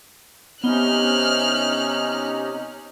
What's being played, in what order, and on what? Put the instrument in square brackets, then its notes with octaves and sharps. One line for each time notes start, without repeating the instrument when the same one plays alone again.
[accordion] C3 C#4 D#4 [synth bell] B3 G7 [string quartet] F6 F#6